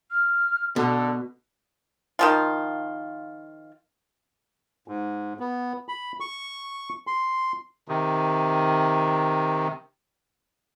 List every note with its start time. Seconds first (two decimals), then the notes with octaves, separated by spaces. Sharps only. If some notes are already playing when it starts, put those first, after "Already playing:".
0.11 F6
0.76 B2 D3 A4
2.19 D#3 F3 F4
4.88 G#2
5.40 B3
5.89 B5
6.20 C#6
7.07 C6
7.88 C3 D#3